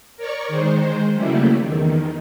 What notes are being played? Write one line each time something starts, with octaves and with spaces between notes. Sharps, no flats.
A#4 C#5 D5 C#6
D#3 G#3 C5
C#3 F#3 G3 A3 A#3 E4
E2 D#3